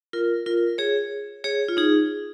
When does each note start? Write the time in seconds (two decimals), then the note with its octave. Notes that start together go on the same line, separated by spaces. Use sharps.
0.13 F4 A#4
0.46 F4 A#4
0.78 G#4 C#5
1.44 G#4 C#5
1.69 F4
1.77 D#4 G#4